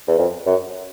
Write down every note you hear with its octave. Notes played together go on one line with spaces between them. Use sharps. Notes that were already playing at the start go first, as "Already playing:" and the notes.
E2
F2
F#2